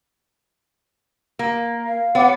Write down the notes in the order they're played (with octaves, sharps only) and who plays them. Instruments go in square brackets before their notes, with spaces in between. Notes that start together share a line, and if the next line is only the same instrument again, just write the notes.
[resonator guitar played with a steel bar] A#3
[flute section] F5
[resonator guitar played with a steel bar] B3 [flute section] C#5 F#5 D6